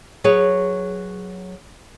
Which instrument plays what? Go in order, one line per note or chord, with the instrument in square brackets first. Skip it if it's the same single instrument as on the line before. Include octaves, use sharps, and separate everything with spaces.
[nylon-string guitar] F#3 G#4 B4 C#5